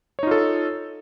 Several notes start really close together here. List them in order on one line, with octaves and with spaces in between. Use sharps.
C#5 D#4 F4 A4